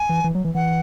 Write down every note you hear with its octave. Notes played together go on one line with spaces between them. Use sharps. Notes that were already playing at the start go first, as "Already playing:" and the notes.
Already playing: G#5
E3
E3
F#3
E3
E3 F#5